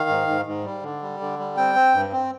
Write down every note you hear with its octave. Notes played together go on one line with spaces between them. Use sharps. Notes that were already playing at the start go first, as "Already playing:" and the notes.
Already playing: D#3 F5
G#2
G#2
G#2
G3
D3
G3
D3
G3
C4 G5
C4
G2
C4